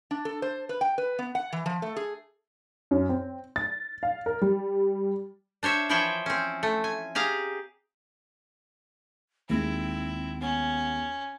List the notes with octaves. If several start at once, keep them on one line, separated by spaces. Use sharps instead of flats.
D4
A4
C5
B4
G5
B4
B3
F#5
E3
F3
A3
G#4
F#2
C4
A6
F5
A#4
G3
D4 C5 C#5 E5
E3 F3 E4 C5 C#5 G5
C4 C#4
A3
G#5
G4 G#4 F5 A#5
D#2 G#3 C4 E4
B3 C#4